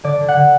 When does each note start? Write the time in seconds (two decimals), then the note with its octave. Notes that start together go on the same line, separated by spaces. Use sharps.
0.04 D3 D5
0.21 D3
0.28 F#5
0.36 D3